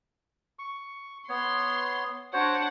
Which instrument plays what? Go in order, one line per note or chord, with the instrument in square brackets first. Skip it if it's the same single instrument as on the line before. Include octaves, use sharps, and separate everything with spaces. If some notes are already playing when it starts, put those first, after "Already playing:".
[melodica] C#6
[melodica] B3 C#5 [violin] C6
[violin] D4 F#5 [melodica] F#4 C5 C#5